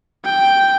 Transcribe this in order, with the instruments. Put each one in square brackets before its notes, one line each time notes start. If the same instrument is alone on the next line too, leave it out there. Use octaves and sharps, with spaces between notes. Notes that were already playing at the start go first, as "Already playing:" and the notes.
[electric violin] G5